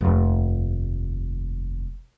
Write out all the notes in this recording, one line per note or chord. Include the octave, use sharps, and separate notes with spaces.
F1 D#2